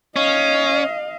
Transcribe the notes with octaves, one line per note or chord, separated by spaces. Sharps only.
C#4 D#5 F5